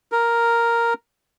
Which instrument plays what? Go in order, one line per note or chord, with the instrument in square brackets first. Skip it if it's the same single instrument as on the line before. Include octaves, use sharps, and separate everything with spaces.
[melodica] A#4